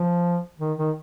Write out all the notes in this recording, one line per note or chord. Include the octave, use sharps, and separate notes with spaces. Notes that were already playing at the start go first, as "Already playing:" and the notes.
Already playing: F3
D#3
D#3